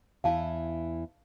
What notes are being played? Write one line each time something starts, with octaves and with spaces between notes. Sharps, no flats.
E2 E3 E4 F5 A5